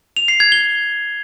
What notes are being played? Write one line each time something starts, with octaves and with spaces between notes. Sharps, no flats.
F7
C7
G#6
G7